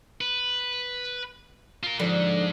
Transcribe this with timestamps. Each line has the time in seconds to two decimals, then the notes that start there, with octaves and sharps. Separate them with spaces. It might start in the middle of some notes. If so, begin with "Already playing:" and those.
0.21 B4
1.83 F4 A#4
2.00 G#2 D3 F3